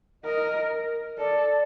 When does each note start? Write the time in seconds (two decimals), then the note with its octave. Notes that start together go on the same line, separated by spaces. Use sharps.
0.25 A#4 D#5
1.18 A4 D5